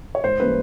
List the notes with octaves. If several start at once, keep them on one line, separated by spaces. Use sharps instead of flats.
C#5
G#2 C5
E3 G3 A#3 C#4 B4